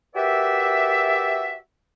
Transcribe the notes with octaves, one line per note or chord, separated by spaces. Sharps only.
F#4 G4 A#4 B4 D5 E5